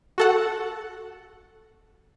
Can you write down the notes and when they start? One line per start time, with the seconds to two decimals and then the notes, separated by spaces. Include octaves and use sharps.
0.18 F#4 A4 F#5